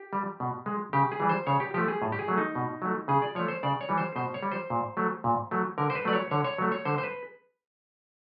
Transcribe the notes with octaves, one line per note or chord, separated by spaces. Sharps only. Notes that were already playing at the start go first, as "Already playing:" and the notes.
Already playing: G4
G3
B2
G#3
C#3 G4
G#4
E3 G3
C5
C#3 C#5
G4
F3 A3 G4
G#4
A2
G4
G#4
F#3 A3
D#4
B2
F#3 A3
C#3 G#4
D5
F3 A3 C#5
C5
C#3 D5
C#5
E3 G3
C5
B2 C5
C#5
G3
C5
A#2
F#3 A3
A#2
F#3 A3
D3 A#4
C5
B4
F#3 A3 D5
C#5
D3 C#5
C#5
F#3 A3
C#5
D3 C5
C5
B4